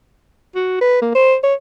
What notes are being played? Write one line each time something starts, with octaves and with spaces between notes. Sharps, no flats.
F#4
B4
A#3
C5
C#5